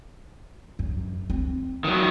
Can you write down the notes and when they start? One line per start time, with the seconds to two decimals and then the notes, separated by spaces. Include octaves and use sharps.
0.79 F#2
1.30 C4
1.84 D#3 F#3